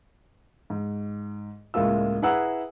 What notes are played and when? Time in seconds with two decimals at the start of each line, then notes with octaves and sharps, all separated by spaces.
0.70 G#2
1.74 C#2 A2 G#3 A#3 F4 E6
2.22 E4 G#4 B4 F#5 A#5 E6